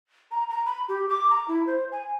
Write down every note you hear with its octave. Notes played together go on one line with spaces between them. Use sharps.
A#5
A#5
B5
G4
D6
A#5
E4
C5
G#5